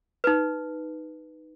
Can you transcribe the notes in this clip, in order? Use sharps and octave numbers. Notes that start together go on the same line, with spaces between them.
D#4 B4